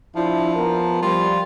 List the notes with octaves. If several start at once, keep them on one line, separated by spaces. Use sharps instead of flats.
F3 D4 E4
B3 A#4
F3 G3 F4